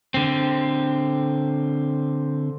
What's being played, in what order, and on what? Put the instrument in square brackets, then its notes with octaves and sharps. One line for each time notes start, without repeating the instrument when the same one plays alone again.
[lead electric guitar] D3 C4